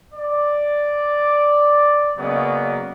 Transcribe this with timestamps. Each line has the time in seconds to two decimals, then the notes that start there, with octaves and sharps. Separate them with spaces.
0.14 D5
2.17 C#3 F#3 A#3 B3 D5 D#5